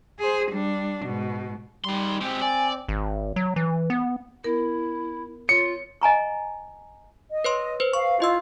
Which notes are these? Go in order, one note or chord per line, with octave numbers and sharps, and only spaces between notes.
G#4 C5
G3 D4
G#2 B2
D#3 G3 C6
G#3 C4 G4
D5 G#5
G#1
F#3
E3
B3
B3 E4 A#4
F4 C#5 C#7
D#5 G#5 A#5 C#6
D#5
B4 C#5 C6
B4 C5
F5 C#6
E4 F4 D#5 E6